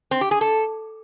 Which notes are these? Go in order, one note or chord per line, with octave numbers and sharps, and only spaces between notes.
C4
G4
G#4
A4